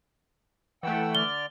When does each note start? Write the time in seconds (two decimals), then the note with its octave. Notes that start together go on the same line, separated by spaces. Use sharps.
0.83 E3 A3 F#5 G5 E6
1.15 D3 D5 F6 G7